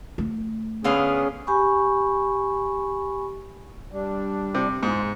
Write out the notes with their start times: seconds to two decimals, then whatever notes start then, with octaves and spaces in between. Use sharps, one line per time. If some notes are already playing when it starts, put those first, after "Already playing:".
0.18 A3
0.84 D3 B3 C#4 G#4 F5
1.47 G4 G#5 B5 C#6
3.92 G3 D4
4.55 C3
4.83 G#2 F4 G#4